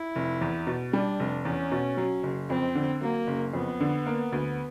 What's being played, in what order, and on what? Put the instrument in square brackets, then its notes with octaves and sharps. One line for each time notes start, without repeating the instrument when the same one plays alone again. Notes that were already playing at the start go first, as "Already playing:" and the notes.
Already playing: [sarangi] E4
[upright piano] F1
E2
B2
[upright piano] G3 [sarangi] D4
[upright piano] F1
[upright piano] E2 [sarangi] C#4
[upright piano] B2
F#3
F#1
[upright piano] F2 [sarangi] C4
[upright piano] D3
[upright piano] F#3 [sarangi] A#3
[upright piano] F#1
[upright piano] F2 [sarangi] B3
[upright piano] D3
A#3
D2